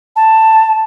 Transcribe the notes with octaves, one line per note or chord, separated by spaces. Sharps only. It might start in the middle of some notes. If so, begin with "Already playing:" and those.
A5